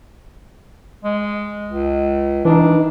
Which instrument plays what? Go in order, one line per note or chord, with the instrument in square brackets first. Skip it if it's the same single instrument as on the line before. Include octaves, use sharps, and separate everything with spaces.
[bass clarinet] G#3
C#2
[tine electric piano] E3 D#4 [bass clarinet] D4